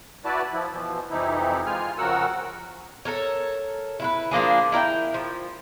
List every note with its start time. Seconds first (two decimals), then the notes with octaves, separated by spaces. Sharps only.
0.25 E4 F#4 B4 D5 A5
0.53 F3 E4
0.73 B2 E3 F3
1.11 F2 C3 E3 D#4 E4
1.66 G#3 F4 G#5 F6
1.98 F2 C#3 F#4 A#4 F#5 E6
3.05 A4 A#4 C#5
4.00 E4 F4 B4
4.31 F3 A#3 D4 G#4
4.72 E4 A#4 D#5 G5
5.14 F3